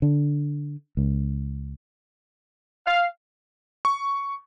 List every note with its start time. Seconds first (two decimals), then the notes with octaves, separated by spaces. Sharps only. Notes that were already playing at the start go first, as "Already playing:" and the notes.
0.02 D3
0.97 C#2
2.86 F5
3.85 C#6